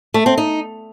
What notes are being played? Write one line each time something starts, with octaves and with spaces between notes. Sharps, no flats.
A3
C4
D#4